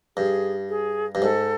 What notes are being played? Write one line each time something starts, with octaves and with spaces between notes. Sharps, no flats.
G2 G#4
G#4
G2
G#2 A4